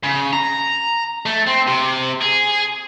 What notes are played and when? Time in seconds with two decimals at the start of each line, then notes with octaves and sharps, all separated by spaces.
0.03 C#3
0.33 A#5
1.26 A3
1.47 C4
1.68 C3
2.21 G#4